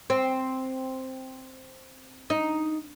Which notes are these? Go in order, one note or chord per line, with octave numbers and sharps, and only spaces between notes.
C4
D#4